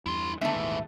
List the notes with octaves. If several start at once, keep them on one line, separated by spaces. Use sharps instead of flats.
E2 G2 E4 C6
G#2 D3 E3 A3 B3 D4 E5
G#1 D#2 A#2